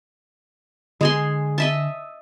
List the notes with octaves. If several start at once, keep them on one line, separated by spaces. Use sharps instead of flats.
D3 G#3 G#4 G#5 C6
D#5 E5 A5